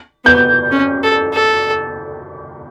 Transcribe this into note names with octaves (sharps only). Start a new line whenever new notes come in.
B3 G6
C#4
A4
A4